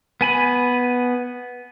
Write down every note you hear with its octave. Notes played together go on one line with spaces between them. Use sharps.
B3 G#5 B5